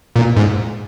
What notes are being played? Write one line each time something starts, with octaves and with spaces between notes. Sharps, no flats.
A#2
G#2